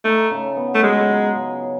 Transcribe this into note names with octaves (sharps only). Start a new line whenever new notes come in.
A3 D#4
C#3
B3
A3
F#3 G#3
D#4
C#3
C#3